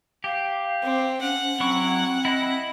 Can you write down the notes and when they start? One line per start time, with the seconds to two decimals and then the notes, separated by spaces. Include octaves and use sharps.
0.24 G4 F5
0.83 C4
1.21 C#4 F#5
1.60 F#3 C4 E4 C#6
2.25 E4 D#5 B5